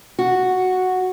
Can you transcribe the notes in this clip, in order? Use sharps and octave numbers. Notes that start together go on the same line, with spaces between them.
F#4